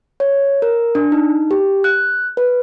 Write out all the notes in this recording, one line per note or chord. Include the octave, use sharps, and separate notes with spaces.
C#5
A#4
D4
D#4
G4
F#6
B4